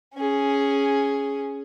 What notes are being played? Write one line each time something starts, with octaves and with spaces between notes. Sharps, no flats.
C#4 G#4